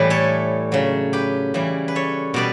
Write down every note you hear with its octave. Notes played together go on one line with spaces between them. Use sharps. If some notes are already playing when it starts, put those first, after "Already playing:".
Already playing: A2 E3 G3 B4
A4 C#5
C#3 F#3
G4 B4
C#3 E3 G3
B4
A4 C#5
B2 G3 B4 D5